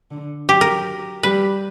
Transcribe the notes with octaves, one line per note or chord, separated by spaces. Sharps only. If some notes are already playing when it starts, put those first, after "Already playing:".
D3
F#3 G4
A#4
G3 B4